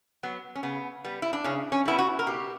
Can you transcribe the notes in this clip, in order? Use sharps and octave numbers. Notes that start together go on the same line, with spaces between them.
F#3 B3
C#4
C#3 B3
G3 B3
E4
D4
C#3 C#4
C#4
G3 B3 E4
F#4
A#4
B2 G4